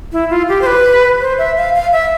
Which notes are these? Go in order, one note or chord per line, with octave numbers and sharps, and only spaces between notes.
E4
F4
G4
C5
B4
C5
E5
F5
F5
E5